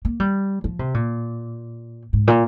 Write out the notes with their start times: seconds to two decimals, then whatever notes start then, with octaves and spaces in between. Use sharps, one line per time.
0.05 A#3
0.20 G3
0.64 F3
0.79 C3
0.94 A#2
2.13 G#2
2.27 A#2